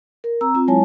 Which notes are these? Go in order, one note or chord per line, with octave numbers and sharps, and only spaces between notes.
A#4
C4 A#5 E6
C4 F4
F#3 G#3 E4 C#5 G#5 A5